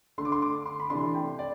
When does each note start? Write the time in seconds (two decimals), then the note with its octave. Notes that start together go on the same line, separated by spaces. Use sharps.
0.18 D3 A3 D4 C6
0.25 D6
0.32 C6
0.42 D6
0.66 C6
0.80 B5
0.90 C3 E3 A3 D4 C6
1.15 G5
1.39 D5